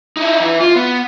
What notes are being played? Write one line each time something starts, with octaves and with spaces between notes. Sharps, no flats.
D#4 E4
E3 E4
F4
B3